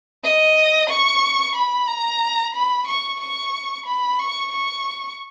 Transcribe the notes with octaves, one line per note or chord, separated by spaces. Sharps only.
D#5
C#6
B5
A#5
B5
C#6
C#6
B5
C#6
C#6